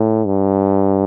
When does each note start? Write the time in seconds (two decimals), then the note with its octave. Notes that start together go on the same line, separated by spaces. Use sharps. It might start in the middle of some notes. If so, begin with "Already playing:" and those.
Already playing: A2
0.25 G2